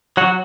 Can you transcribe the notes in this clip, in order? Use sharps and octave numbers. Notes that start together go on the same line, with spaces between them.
F#3 F#4